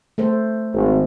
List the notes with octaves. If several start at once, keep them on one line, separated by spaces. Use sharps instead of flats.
A3 A4 C5
G#1